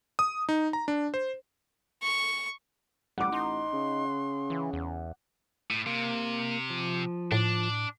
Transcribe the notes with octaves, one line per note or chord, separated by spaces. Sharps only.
D#6
D#4
A#5
D4
C5
C#6
A1 G3 F#5 D6
D#4 C6
C#3
E3
E2
A2
C3 A#3
F3
A2 D4